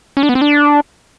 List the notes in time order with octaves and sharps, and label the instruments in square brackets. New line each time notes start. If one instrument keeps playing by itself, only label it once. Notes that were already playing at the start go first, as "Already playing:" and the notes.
[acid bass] C#4
D4
B3
C4
D4